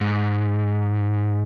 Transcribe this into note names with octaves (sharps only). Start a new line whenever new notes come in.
G#2